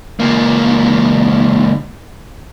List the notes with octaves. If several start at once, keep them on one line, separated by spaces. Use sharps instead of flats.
C#2 A#3